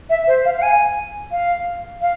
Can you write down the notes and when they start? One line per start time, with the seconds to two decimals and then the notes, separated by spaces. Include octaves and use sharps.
0.09 E5
0.27 C5
0.44 F5
0.56 F5
0.61 G#5
1.31 F5
2.01 F5